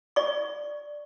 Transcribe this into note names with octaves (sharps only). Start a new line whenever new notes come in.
D5 C#6